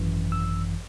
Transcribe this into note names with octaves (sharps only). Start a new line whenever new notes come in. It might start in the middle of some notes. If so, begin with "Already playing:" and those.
Already playing: G#1 F#2 E3
E6